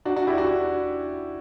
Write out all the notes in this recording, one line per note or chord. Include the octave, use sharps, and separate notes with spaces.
D4 F#4
D4 F#4
E4 G4
D4 F#4